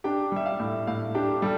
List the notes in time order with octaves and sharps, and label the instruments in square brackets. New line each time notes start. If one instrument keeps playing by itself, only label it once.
[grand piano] D4 G4 G5
G3 E5
F5
A2
A2 F5
D4 G4 G5
G3 A4 A5